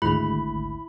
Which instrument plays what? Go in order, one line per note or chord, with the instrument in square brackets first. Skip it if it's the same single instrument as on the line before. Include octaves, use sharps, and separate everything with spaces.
[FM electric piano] G#1 D2 G#2 [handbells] E4 B5